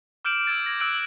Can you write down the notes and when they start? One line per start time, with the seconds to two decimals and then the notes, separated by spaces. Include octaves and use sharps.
0.25 D6 F6 G6 D7 E7 F#7
0.47 E6 F6 G#6 A6
0.66 G#6 A#6
0.80 E6 F#6 G#6 D7 F#7